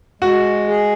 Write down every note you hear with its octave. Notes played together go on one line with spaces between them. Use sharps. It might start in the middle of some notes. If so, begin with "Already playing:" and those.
G#3 F#4
G#4